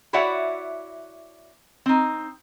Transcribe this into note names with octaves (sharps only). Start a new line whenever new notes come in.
E4 F#4 C#5 D5 E5 F#5
C4 D#4